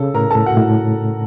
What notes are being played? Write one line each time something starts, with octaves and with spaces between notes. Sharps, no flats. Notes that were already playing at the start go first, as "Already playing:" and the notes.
Already playing: C#3 A4
A2 A#4 A#5
A2 A4 A5
F#4 F#5
A2